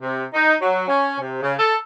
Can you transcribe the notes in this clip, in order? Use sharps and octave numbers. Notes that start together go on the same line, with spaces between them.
C3
D#4
F#3
C#4
C3
C#3
A4